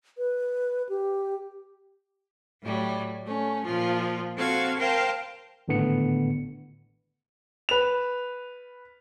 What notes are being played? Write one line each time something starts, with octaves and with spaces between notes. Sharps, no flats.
B4
G4
A2 F#3 G3
A3 C#4
A#2 F3 F4
C4 F#4 A4 F5 G#6
A#4 C5 F5 G5 A5 A#5
G#1 A2 D3 B3 C#7
B4 F7